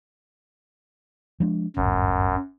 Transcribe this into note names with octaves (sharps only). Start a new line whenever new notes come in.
F3 G#3 D4
D1 G1 F#2